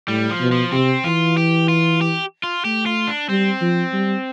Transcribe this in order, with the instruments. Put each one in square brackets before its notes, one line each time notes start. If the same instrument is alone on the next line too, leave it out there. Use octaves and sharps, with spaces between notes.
[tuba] A2 [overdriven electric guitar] G3
[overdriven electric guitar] F3
[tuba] B2
[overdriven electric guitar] F3
[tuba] C3 [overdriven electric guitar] C4
[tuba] E3 [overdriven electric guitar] F4
[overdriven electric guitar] G4
F4
G4
F4
[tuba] A3 [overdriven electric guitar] G4
[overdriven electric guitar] F4
D4
[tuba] G3 [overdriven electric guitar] C4
[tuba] F3
G3